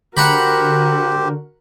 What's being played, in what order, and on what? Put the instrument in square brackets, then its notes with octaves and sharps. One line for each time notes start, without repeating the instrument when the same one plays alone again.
[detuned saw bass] D3 [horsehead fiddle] F#4 A#4 [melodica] G4 C5 [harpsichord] F#5 A#5 B5